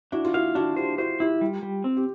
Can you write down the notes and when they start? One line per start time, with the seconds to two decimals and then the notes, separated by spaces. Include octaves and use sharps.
0.12 D4 E4 F#4
0.25 F4
0.34 E4 F#4 F5
0.55 D4 E4 F#4
0.76 F4 G4 C5
0.98 E4 F#4 C5
1.20 E4 F4 G4
1.41 G3
1.63 G3
1.84 C4
1.97 G4